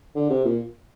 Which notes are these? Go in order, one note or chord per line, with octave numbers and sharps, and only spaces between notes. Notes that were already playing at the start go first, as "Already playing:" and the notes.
D3
C3
A#2